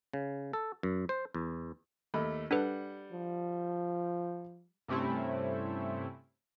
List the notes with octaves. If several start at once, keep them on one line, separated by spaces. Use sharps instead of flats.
C#3
A4
F#2
C5
E2
D#2 A3 B5
G3 D4 A4 B4 F#5
F3
G2 C3 A3 C4 C#4 E4